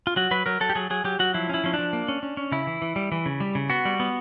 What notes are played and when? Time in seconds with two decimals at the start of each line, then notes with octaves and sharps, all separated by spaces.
0.07 F4
0.16 F#3 F#4
0.31 F#3 B4
0.46 F#3 A#4
0.61 F#3 A4
0.70 G4
0.75 F#3 G#4
0.90 F#3 G#4
1.04 F#3 G4
1.19 F#3 F#4
1.34 F3 E4
1.49 C#4 E4
1.64 F3 C#4
1.74 D4
1.79 F3
1.93 A#3
2.08 C#4
2.23 C#4
2.37 C#4
2.52 C#3 E4
2.67 E3
2.82 E3
2.96 G3
3.12 E3
3.26 C#3
3.40 G3
3.55 C#3
3.70 B3 F#4
3.85 G3
4.00 B3